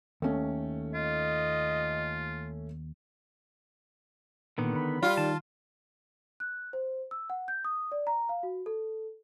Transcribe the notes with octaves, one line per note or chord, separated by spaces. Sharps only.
D#2 A3 C#4
F4 D#5
A#2 D3 D#3 B3
B5
G3 F4
D#3 A5
F#6
C5
E6
F#5
G6
D#6
D5
A#5
F5
F#4
A4